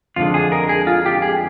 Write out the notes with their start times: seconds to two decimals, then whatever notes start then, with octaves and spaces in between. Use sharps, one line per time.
0.16 F2 D3 G#3 F4
0.34 G#4
0.52 A#4
0.69 G#4
0.87 F4
1.06 G4
1.22 G#4